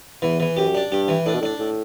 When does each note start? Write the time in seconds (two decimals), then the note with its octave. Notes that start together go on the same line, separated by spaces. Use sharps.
0.22 E2 E3
0.40 E3
0.57 F#2 G4
0.75 D4
0.91 G2 G4
1.08 E3
1.26 A2 D4
1.34 B2
1.41 A2 D4
1.59 A2